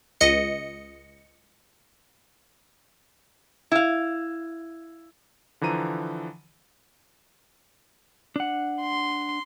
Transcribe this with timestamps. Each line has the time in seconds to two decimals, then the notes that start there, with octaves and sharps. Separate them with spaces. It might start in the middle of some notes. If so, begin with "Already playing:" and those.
0.21 C#2 D#5 C#7
3.72 E4 F5
5.61 D3 E3 F3 A#5 D#7
8.36 D4 F#5
8.82 C6